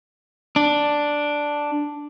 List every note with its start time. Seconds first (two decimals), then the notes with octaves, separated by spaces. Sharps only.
0.56 D4